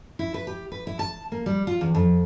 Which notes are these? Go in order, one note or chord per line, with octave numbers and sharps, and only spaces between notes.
E4
B4
G4
B4
E4
A5
A#3
G3
F4
E2
F2